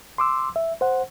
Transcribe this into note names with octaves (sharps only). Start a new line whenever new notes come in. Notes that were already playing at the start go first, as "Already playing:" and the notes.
C6 D6 E6
E5
C5 F#5